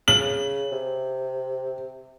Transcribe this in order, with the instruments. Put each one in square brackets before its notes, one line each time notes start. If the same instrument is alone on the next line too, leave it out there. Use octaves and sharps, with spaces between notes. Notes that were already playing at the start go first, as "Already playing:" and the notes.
[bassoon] C#3 [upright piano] F#7
[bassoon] C3